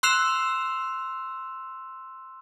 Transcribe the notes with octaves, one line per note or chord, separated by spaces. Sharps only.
C6 E6 F#6 C7 E7 F7